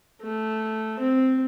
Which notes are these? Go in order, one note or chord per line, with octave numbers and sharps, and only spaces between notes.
A3
C4